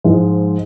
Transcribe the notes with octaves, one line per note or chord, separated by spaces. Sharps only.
G#2 F3 G#3